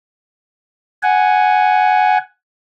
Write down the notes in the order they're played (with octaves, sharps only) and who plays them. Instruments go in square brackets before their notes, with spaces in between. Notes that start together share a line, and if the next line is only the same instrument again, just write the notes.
[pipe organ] F#5 G#5